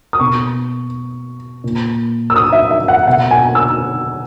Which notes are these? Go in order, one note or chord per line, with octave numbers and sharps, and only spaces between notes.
D#6
B2 C#6
A#2
E6
D#6
E5
E5
F#5
B2 F#5
G#5
E6